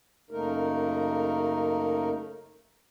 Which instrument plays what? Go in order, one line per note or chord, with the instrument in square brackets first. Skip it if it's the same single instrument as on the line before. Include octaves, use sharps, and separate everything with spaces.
[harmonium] F#2 C#3 A3 A#3 D#4 A#4